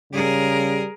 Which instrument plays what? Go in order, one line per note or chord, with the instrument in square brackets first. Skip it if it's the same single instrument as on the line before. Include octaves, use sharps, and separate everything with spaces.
[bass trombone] C#3 [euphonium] G3 [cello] G#4 A#4